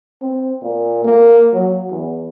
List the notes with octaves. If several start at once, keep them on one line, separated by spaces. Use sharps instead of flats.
C4
A#2
A#3
F#3
E2